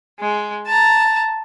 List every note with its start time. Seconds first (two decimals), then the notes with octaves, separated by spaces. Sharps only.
0.20 G#3
0.67 A5 A#5